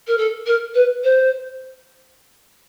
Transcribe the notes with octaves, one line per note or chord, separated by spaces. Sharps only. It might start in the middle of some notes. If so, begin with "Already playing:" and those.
A#4
A4
A#4
B4
C5